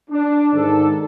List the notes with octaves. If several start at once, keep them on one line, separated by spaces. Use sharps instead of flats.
D4
G#2 D#3 A4